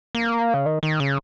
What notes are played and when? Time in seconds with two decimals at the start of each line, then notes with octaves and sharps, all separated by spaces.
0.15 A#3
0.54 C#3
0.66 D#3
0.83 D#3
1.00 C#3